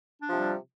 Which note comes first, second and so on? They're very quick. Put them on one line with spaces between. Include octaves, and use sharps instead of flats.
D4 F3 C3 G3